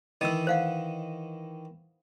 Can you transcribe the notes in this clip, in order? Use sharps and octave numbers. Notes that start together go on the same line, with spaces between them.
D#3 E3 D#5 D#6 E6
C5 F5 F#5